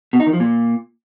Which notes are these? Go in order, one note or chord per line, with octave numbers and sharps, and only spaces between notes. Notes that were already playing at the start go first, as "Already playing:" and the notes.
B2
D#4
D#3
F3
A#2